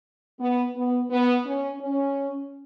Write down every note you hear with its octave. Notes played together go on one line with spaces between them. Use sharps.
B3
B3
B3
C#4
C#4